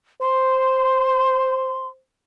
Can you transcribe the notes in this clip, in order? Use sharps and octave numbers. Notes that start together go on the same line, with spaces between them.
C5 C6